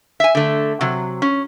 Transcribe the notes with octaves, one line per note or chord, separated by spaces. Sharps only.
E5 G#5
D3 A3
C3 F#3
C#4